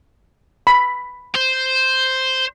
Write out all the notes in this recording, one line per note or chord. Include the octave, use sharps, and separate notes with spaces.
B5
C5